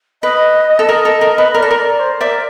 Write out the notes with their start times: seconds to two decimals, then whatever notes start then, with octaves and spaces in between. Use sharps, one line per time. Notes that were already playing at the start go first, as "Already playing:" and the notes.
0.22 B4 D#5
0.79 A4
0.88 A#4 D#5
1.05 A4
1.21 A#4
1.38 B4
1.54 A#4 D5
1.62 A4
1.71 A#4
1.76 D5
1.99 C5
2.20 A#4 D5 E5